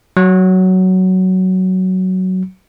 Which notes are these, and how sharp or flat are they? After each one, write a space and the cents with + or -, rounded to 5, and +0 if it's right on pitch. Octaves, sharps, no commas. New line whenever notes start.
F#3 +10